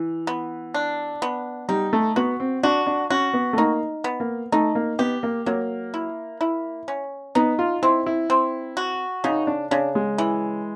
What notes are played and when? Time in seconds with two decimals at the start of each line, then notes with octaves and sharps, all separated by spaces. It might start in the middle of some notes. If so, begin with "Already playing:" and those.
Already playing: E3
0.27 B3
0.74 D4
1.22 B3
1.69 G3 D#4
1.93 A3
2.16 B3 F#4
2.40 C4
2.63 D4 F#4
2.87 D4
3.10 C#4 F#4
3.34 B3
3.53 A3
3.57 A#3 D#4
4.04 B3
4.20 A#3
4.52 A3 D#4
4.75 A#3
4.99 B3 G4
5.23 A#3
5.46 F#3 A#3
5.94 E4
6.41 E4
6.88 C#4
7.35 B3 D#4
7.59 F4
7.83 C4 E4
8.06 E4
8.30 C4
8.77 F#4
9.24 C#3 D#4
9.47 D4
9.71 C#3 D4
9.95 G#3
10.18 E3